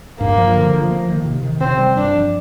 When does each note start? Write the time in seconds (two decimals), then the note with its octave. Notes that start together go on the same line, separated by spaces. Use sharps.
0.20 G2 A#3
0.38 F3
0.56 D3
0.73 F3
0.91 A#3
1.08 D#3
1.25 C3
1.43 D#3
1.60 C3 C4
1.79 G3
1.96 G2 D4
2.14 F3